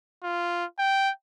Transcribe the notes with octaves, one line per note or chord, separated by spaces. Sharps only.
F4
G5